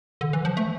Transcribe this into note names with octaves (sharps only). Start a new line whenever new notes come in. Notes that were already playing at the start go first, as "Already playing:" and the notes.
D3
E3
F3
A3